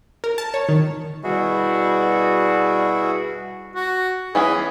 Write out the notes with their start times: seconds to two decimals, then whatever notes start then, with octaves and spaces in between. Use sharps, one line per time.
0.24 A#4
0.38 A5
0.54 C#5
0.69 D#3
1.24 B2 G3 E4 F#4 G#4
3.75 F#4
4.35 E3 B3 C#4 G#4